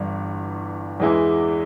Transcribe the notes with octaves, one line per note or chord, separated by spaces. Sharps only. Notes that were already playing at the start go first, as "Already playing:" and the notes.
Already playing: G1 G2 E3
E2 E3 G#3 E4 G#4